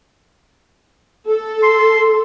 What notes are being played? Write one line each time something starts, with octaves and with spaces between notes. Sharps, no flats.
A4
C6